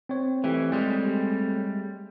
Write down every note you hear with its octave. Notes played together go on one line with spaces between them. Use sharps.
C4 C#5
E3 A3 G4
G3 G#3